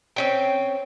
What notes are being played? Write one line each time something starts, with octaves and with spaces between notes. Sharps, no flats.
C4 C#4 G5